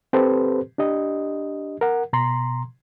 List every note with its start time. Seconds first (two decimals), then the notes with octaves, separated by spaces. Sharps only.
0.13 C4 G4 A4 B4 C5
0.78 D4 G4 D#5
1.81 A#4 F#5
2.13 B2 A#5 C6